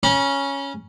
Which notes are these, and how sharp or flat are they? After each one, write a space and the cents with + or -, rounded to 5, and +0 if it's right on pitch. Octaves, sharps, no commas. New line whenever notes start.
C#4 +0 B5 -45